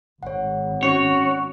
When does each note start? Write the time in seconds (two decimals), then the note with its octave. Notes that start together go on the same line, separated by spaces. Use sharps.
0.23 G#1 C#5 F#5
0.83 C#4 F#4 C#5